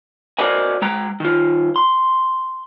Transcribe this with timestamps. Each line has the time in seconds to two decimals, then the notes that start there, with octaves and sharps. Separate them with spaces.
0.39 F#4 A#4 C5 D5 D#5 G#5
0.82 G#3 G5 A#5
1.20 D#3 F4
1.76 C6